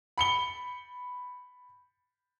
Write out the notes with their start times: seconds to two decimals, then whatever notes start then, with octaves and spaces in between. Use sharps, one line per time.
0.18 B5 C#7 G7